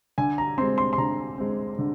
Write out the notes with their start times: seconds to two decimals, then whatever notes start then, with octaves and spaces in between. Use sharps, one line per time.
0.18 D3 G#5
0.38 A#5
0.58 G#3 C4 C6
0.78 C6
0.93 C6
0.98 D3 A#5
1.38 G#3 C4
1.79 D3